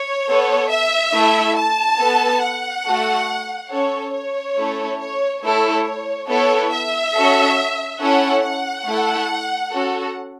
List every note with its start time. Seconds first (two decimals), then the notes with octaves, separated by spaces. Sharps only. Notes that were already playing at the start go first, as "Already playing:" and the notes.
Already playing: C#5
0.28 B3 A4
0.70 E5
1.13 A3 E4 A4
1.56 A5
1.99 B3 A4
2.42 F#5
2.85 A3 F#4 A4
3.71 C#4 A4 C#5
4.14 C#5
4.57 A3 C#4 E4 A4
5.00 C#5
5.43 A3 E4 A4 C#5
6.29 B3 E4 A4 C#5
6.72 E5
7.14 C#4 F#4 A4
8.01 C#4 E4 A4 F#5
8.44 F#5
8.87 A3 E4 A4
9.72 C#4 F#4 A4